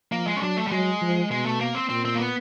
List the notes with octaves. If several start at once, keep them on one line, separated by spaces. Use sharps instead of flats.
F3 A#3
G#3
C#4
F#3 D4
A3
G3
F#3 G#3
F3
B2 G#3
A3
A#3
C4
A#2 C4
C4
A#3
B3